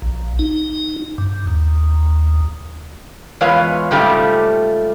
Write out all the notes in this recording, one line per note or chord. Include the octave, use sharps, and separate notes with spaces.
A#1
D#4
G2
D#2
E2 G#3 F4 B4 C#5 F5
G#2 C#3 G3 A3 F4 G4